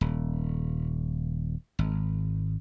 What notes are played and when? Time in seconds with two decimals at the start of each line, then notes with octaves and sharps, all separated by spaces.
0.01 D#1
1.79 G#1